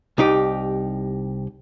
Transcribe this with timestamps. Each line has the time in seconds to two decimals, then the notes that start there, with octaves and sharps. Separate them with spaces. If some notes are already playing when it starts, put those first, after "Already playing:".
0.18 C2 D#4 G4